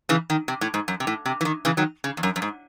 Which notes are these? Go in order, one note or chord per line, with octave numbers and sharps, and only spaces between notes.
C#3 E3
D#3
C3
A2
G#2
F#2
C3
A2
C3
E3
D#3
C#3 E3
D#3 F#3
C#3
E2
F#2
F#2
G#2